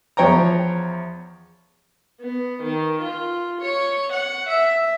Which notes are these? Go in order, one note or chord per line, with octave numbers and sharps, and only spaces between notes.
E2 F3 C#5 G5 A#5
B3
D#3
F4
C#5
F#5
E5